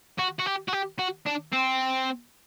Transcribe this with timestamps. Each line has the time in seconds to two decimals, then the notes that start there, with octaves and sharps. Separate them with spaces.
0.19 F#4
0.39 F#4
0.46 G4
0.68 F#4
0.73 G4
0.99 F#4
1.26 D4
1.53 C4